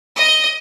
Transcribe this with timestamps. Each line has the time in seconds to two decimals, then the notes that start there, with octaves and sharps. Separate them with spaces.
0.16 D#5